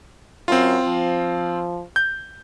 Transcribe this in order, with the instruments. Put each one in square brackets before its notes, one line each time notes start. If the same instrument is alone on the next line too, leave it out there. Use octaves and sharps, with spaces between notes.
[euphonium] F#2 [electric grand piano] C4 F4
[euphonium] F3
[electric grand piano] G6